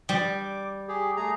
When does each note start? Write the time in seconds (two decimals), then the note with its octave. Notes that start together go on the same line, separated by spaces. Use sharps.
0.09 G3 D6
0.88 G4 G#4
1.17 A3 G#4 A#5